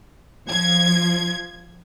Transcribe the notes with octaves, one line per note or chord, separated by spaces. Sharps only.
F3 G#6